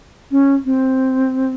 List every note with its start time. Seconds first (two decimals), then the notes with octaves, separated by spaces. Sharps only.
0.31 C#4
0.65 C4